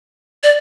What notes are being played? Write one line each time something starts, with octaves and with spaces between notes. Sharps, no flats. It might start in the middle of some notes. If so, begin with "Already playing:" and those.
D5